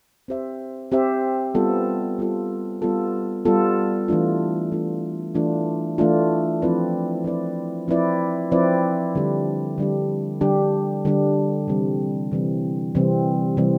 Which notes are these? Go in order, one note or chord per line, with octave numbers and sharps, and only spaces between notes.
C4 G4 C5 E5
C4 G4 C5 E5
G3 B3 F4 A4
G3 B3 F4 A4
G3 B3 F4 A4
G3 B3 F4 A4
E3 A3 D4 F4
E3 A3 D4 F4
E3 A3 D4 F4
E3 A3 D4 F4
F3 C4 E4 B4 D5
F3 C4 E4 B4 D5
F3 C4 E4 B4 D5
F3 C4 E4 B4 D5
D3 G3 D4 G4
D3 G3 D4 G4
D3 G3 D4 G4
D3 G3 D4 G4
C3 E3 G3 C4
C3 E3 G3 C4
C3 E3 G3 C4
C3 E3 G3 C4